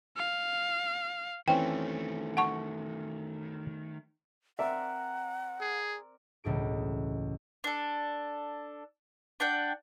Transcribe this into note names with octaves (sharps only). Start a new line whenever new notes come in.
F5
D#3 E3 A3 C4 C#4 G5
F#5 A5 C#6
C4 A#4 D5 E5 F#5
G#4
E1 C#2 A2 G#4 D7
D4 A4
D4 F#5 G5